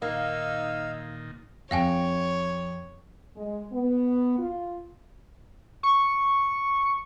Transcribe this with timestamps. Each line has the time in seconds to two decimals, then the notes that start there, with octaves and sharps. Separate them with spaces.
0.02 A#2 D#3 A#3 D#4 F5 E6
1.71 F2 C#5 F5 G5 G#5 D7
3.36 G#3
3.72 B3
4.39 F4
5.83 C#6